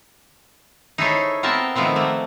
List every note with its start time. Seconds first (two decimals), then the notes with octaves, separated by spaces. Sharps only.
0.98 D#4 E4 G#4 A4 C5 C#5
1.43 B3 C4 A#4 E5 G5 A5
1.76 D#3 F3 A3 B3 C4
1.96 A3 A#3